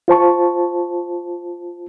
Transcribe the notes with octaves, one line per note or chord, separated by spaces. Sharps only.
F4 C5 A5 C#6